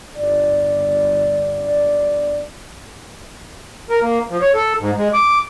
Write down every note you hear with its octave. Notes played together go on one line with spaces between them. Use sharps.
G1 D5
A#4
A#3
F3
C#5
A4
G#2
G#3
D6